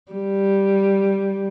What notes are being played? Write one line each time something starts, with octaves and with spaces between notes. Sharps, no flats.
G3